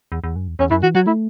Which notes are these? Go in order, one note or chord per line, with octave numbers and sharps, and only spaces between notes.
E2
E2
F#2
E2
E2 C#4
F#2 E4
E3 F#4
F#3 F#4
A3 E4